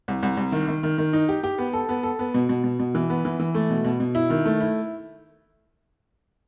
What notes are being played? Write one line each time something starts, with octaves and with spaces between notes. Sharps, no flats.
C2
C2
C2
D#3
D#3
D#3
D#3
D#4
G4
G4
B3
A4
B3
A4
B3
B2
B2
B2
B2
E3
B3
E3
E3
A3
B2
B2
B2
E4
D#3
A3
E4